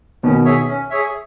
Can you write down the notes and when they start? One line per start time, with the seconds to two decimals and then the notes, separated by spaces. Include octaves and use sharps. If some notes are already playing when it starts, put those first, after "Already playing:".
0.23 B2 D#3 C#4
0.45 G#4 C#5 E5
0.68 C#4
0.90 G#4 C#5 E5